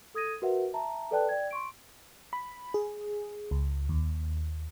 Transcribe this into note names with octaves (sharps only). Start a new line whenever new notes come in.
A4 D#6 G#6 A#6 D#7
F#4 A#4 B4 E5 F#5
E5 A5 A#5
A4 B4 D5 G5 A5 F#6
D5 G5 G#6
C6 C#6 D7
B5
G#4
C#2
D#2